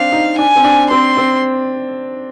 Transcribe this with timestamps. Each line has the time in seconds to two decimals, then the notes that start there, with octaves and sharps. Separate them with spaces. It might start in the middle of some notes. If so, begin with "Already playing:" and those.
Already playing: C4 D4 F5
0.12 D#4
0.38 D4 G#5
0.56 C4
0.64 D4
0.90 C4 C6
1.17 C4